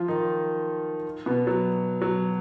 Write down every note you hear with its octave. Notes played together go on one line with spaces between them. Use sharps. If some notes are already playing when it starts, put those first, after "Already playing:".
Already playing: F3 F4
D#3 D#4
B2 B3
F#3
F#3